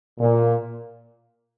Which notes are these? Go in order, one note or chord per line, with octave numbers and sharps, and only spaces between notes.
A#2